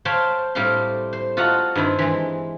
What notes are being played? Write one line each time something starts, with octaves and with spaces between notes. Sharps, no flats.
C5 C#5 F5 G5 A5 B5
A2 G3 C4 G4 F5 C6
C5
F4 F#4 D#5 F#5 A5 A#5
G2 D#3 C4 E4
E3 G#3